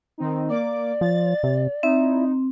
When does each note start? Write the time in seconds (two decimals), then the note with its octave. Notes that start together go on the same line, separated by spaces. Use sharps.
0.18 D#3 C4 D#4
0.50 A#3 D5 D6
1.01 F3 A6
1.43 C3
1.83 C4 D#4 E4